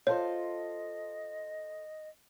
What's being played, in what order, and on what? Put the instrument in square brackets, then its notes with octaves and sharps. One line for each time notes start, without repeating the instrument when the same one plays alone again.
[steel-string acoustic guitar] F4 A4 C5 [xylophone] C#5 [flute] D#5